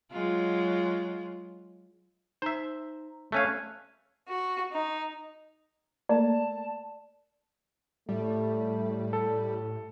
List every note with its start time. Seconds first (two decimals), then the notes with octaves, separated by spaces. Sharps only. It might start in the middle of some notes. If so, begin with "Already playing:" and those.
0.12 F#3 G#3 F4
2.42 D#4 C5 E5 A#5
3.32 A3 C#4 F5 F#6 G#6 D#7
4.29 F#4
4.72 D#4
6.09 A3 A#3 D5 A5
8.09 A2 G3 A3
9.13 A4